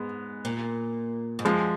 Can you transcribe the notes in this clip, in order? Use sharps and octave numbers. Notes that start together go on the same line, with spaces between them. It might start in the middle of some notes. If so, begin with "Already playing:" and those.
Already playing: G#2 G#3 B3
A#2
G#2
F#2 F3 G#3